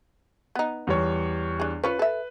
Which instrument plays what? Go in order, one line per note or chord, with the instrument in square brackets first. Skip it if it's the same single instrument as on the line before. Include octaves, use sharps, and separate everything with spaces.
[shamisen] B3 D#4
[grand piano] E2 G3 C#5
[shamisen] D4 G#4
[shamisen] C#4 F4 C#5 [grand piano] B4
[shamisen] A4 E5